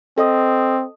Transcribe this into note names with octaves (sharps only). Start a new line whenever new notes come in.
C4 A4 D#5 D#6